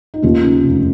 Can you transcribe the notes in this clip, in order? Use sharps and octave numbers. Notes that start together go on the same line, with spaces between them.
D#4
D#2 C#4 F4
C#3
F1